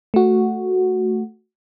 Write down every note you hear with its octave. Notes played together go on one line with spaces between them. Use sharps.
A3 F#4